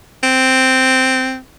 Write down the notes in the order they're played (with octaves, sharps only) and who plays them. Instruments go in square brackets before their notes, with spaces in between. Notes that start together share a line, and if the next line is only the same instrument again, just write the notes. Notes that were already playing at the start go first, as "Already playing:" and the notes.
[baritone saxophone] C4